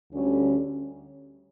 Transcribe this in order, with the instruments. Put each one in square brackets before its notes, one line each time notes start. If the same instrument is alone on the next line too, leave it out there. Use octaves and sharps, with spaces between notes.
[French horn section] D2 D3 G3 C#4